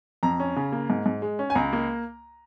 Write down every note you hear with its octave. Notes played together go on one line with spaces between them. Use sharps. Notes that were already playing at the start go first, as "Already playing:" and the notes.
F2 A#5
C#4
C#3
A#3
G#2
G#2
G#3
C#4
G#5
C#2 A#5
A#3